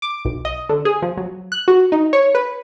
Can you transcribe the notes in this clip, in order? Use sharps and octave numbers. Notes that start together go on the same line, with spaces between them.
D6
B1
D#5
D3
G#4
F3
F#3
F#6
F#4
D#4
C#5
B4